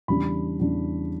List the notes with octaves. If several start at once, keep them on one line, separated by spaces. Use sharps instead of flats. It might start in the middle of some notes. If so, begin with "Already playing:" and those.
E2 C#3 G3 D4 B5
E2 C#3 G3 D4